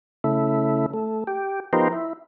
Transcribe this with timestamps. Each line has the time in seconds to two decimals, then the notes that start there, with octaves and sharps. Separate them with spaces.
0.24 C#3 A3 E4
0.93 A3
1.27 G4
1.73 F3 B3 D#4 G4 A#4 C5
1.92 E4